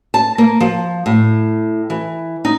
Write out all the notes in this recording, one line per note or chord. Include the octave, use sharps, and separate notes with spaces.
A5
A#3
F3
A2
E3
D#4